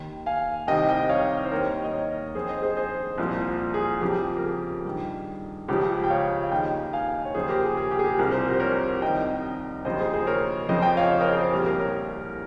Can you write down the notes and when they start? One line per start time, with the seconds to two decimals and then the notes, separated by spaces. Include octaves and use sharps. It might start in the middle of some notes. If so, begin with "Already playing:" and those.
Already playing: D#2 D#3
0.26 F5 G#5
0.67 C2 C3 D#3 D#5 G5
0.89 D#5 G5
1.09 C#5 F5
1.44 C5
1.51 D#2 D#3 A#4 C#5
1.84 D#5
1.93 A#4 C#5
2.35 F2 D#3 G#4 C5
2.48 C5 D#5
2.62 G#4 C5
2.77 G#4 C5
3.18 C2 A#2 F3
3.74 G#4
4.01 F2 C#3 F3 G4
4.37 A#4
4.43 G#4
4.85 G2 D#3
5.68 C#2 C#3 F3 G4
6.04 G5
6.10 C#5 F5
6.43 F5
6.51 D#2 D#3 D#5 G5
6.93 F5 G#5
7.25 C#5
7.35 D#2 C#3 F3 G#4 C5
7.49 G4 A#4
7.63 G#4
7.77 G#4
7.91 G4
7.99 G#4
8.05 G4
8.18 C2 C3 F3 A#4
8.32 C5
8.46 G4 A#4
8.53 C5
8.60 A#4 C#5
9.02 C2 C3 D#3 D#5 G5
9.85 D#2 C#3 F3 C5 D#5
9.99 G#4 C5
10.13 G#4 C5
10.27 A#4 C#5
10.68 F2 C#3 F3 C5 D#5
10.82 D#5 G5
10.97 C#5 F5
11.10 C5 D#5
11.21 A#4 C#5
11.31 G#4 C5
11.42 G#4 C5
11.52 C2 A#2 F3 G4 A#4
11.66 G4 A#4
11.80 A#4 C#5